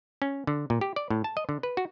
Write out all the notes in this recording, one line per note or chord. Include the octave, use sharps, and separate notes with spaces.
C#4
D3
A#2
G4
D5
A2
A5
D#5
D3
B4
F#4